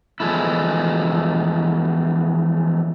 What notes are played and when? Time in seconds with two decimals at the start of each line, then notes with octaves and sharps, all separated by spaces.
0.20 E2 F3 G#3 A3 E4